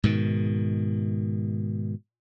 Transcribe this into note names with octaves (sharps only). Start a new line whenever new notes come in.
G#2 B2 D#3